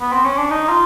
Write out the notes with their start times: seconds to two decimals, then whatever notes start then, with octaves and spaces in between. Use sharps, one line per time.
0.00 B3
0.12 C4
0.25 C#4
0.38 D4
0.50 D#4
0.69 F4